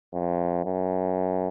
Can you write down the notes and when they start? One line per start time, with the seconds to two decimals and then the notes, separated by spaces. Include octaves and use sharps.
0.14 F2
0.65 F#2